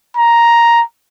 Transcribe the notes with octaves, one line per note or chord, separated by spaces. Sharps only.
A#5